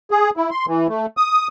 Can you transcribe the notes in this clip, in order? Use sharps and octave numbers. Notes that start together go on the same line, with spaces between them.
G#4
E4
C6
E3
A3
D#6